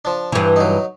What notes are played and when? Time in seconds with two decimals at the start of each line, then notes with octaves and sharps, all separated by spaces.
0.05 F3 D4
0.32 G2 E3
0.56 F#3 D#4